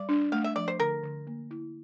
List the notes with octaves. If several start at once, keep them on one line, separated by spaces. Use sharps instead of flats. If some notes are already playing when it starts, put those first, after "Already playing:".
Already playing: G3 D5
D4
A3 F5
E5
F3 D5
C5
D3 A#4
D3
A#3
E4